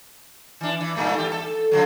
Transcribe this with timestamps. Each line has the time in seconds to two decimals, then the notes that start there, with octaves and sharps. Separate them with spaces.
0.61 E3 D4
0.81 E3
0.96 G2 A#2 A3
1.18 E2 G4
1.32 A4
1.71 C#3 F3 F#3